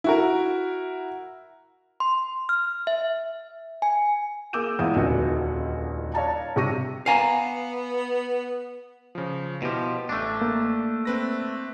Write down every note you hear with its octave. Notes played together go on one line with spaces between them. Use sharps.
E4 F#4 A#4
C6
F6
E5
G#5
A#3 G#4 D6 E6 G6 E7
E2 A#2 G#3 E4 F5 D#6
D#1 C#2 D3 D#4 F#4
C#5 D5 F5 A5 A#5
G2 C3 G4 C#6 A#6 D#7
B3 F5 G#5 A#5
C#3 F3
B2 F3 E4 G4
A1 A3 D4
A#3
C4 B4 A#6